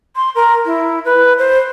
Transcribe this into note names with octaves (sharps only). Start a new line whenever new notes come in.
C6
A#4
E4
B4
C5